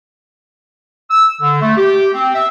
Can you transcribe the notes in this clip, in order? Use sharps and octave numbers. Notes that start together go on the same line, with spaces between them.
E6
D3
A3
G4
C4
E5